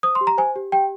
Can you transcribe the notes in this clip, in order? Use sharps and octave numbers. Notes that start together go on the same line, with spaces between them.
C5 D#6
C6
G4
A#5
C5 G#5
G4
G4 G5